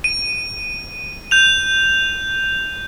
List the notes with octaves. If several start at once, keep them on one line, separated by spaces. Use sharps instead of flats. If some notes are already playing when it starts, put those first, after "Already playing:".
D#7
G6 F7